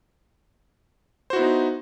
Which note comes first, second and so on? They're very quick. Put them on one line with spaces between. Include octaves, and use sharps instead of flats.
C5 F#4 E4 B3 D#4